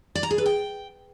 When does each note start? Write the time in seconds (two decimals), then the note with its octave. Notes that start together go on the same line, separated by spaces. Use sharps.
0.15 D5
0.23 A#5
0.31 G#4
0.38 B4
0.46 G5